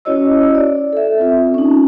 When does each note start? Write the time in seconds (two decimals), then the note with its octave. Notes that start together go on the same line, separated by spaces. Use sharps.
0.05 C#4 E4 F#4 C#5 D#5 E6
0.55 D5
0.93 A4 E5
1.19 C4 F4
1.54 C#4 D#4